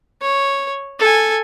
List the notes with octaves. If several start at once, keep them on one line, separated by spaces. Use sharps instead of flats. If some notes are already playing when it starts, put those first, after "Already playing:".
C#5
A4 G#5